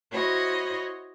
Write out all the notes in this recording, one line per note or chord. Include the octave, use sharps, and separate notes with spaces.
E4 F#4 C5 C#5 D#5 B5